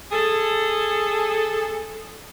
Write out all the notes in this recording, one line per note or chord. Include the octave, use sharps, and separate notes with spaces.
G#4 A4